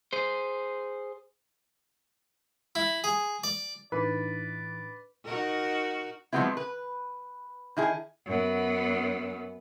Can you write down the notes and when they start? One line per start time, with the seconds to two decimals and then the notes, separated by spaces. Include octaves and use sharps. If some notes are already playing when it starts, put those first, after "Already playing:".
0.13 G#4 C5
2.75 E4
3.04 G#4
3.44 D5
3.92 A2 E3 D4 D#4 B4 D5
5.25 D#4 F#4 A#4
6.33 F3 F#3 G#3 B3 C4 E4
6.57 B4
7.77 D#3 E4 G#4
8.26 F#2 B3